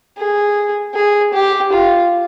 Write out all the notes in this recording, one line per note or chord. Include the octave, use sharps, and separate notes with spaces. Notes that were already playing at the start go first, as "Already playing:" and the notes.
G#4
G#4
G4
F4